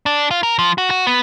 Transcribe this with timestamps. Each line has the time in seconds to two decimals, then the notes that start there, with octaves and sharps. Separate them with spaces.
0.06 D4
0.31 F4
0.43 A#4
0.59 F3
0.78 F#4
0.90 F#4
1.07 B3